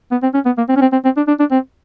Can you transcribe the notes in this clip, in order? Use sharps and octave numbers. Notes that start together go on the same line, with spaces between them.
B3
C4
C#4
B3
A#3
C4
C#4
C4
C4
C4
D4
D4
D4
C4